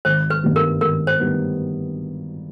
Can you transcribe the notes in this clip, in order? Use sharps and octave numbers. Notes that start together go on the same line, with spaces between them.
G#1 C5
B4
G2 D#3 G3 B3
A#4
G#1 A#4
C5
D#3 G3 B3